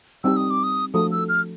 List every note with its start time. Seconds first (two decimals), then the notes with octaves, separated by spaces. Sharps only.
0.24 G3 C4 D#4 G4 E6
0.37 D#6
0.50 D6
0.63 D#6
0.94 F3 A3 D4 F#4 A4 D#6
1.12 E6
1.29 F6